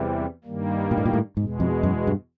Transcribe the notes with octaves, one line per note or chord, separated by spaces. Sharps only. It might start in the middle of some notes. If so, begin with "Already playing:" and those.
Already playing: E2 C3 E3 G3
G2 D#3 G3 A#3
A#2
A2
A#2
A2
E2 G#2 B2 G#3
F2
F#2
G2